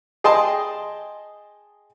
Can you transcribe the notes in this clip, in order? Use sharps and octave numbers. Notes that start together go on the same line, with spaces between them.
G#4 D#5 G5 A5 C6 D#6